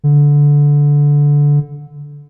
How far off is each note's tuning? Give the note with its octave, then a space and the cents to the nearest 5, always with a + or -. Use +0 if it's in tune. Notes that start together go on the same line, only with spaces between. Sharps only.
D3 -15